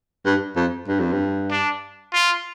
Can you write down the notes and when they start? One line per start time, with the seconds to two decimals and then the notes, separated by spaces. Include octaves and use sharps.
0.25 G2
0.56 F2
0.88 G2
1.00 F2
1.12 G2
1.51 D4
2.14 F4